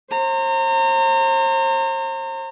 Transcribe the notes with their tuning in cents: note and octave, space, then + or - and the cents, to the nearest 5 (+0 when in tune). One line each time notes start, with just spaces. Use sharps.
C5 +35 A#5 -35